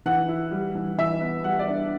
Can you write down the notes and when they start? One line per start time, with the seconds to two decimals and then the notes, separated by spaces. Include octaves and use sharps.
0.06 E3 F#5
0.28 E4
0.51 G3
0.75 E3
0.98 E3 E5
1.21 B3
1.44 G3 F#5
1.59 D5
1.68 D4